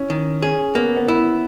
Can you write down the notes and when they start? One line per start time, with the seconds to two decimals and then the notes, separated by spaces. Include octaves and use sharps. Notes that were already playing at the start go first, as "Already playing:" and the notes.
Already playing: C#4 E4
0.10 D#3
0.42 C#4 G#4
0.75 A#3 B3
0.97 B3
1.08 B3 E4